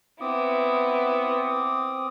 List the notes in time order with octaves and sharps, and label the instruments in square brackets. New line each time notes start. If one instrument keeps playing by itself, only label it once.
[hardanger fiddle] B3 E4 [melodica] C4 D6 D#6